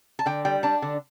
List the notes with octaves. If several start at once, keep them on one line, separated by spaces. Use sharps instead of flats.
A5
D3 G5
G3 G5
D4 A5
D3